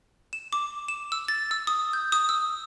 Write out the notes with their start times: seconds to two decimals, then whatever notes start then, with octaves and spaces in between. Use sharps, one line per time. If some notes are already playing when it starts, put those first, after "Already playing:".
0.33 E7
0.53 D6
0.88 E7
1.12 E6
1.28 A6
1.51 E6
1.67 D#6
1.93 G6
2.12 D#6
2.29 E6